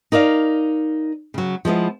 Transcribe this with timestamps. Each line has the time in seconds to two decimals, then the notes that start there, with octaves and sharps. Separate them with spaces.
0.12 D#4 A#4 D5 E5 F5
1.34 C#3 F#3
1.65 F3 G#3 B3 E4